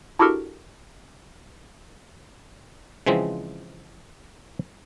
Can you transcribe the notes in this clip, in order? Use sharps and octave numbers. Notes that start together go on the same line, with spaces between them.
D4 E4 F#4 G4 A4 A#4
C#3 E3 F3 G#3 C4